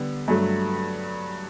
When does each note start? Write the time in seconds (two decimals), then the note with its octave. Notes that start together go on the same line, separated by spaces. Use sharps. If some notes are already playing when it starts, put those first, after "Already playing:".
Already playing: D3 G3 B3
0.28 G2 F#3 A3